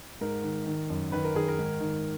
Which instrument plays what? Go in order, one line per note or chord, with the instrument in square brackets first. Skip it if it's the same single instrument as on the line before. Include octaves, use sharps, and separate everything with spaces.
[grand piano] G#2 A#4
D#3
D#3
F#2
D#3 B4
A#4
D#3 G#4
A#4
G#2
D#3